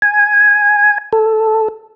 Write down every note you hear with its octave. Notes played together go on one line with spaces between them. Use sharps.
G#5
A4